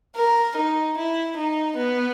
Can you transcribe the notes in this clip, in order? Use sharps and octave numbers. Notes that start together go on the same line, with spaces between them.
A#4
D#4
E4
D#4
B3